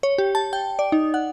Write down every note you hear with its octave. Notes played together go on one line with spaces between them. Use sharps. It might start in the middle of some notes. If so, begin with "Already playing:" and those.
C#5
G4
A5
G5
D5
D#4
F#5